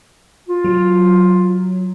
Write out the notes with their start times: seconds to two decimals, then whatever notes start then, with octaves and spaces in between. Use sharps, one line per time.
0.49 F4
0.64 F#3